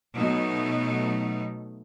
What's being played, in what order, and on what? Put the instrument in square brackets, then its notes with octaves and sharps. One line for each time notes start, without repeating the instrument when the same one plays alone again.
[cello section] B2 F#3 A3 B3 D#4